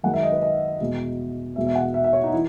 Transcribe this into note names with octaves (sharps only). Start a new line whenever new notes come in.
F#2 D#3 G#3 F#5
E5
D#5
B4
D#5
E2 B2 G#3
E2 B2 G#3 E5
E5
F#5
E5
E5
C#5
D#4
E3 E4